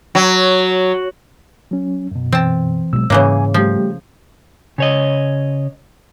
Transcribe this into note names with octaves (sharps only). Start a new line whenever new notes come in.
F#3
F#3 C#4
F#2 B2
E3 C4 A5
B2 F#3 G#3 E6
G#2 C#3 E3 A#3 C#5 G#5
F3 G3 A3 G4
C#3 C#5 D#5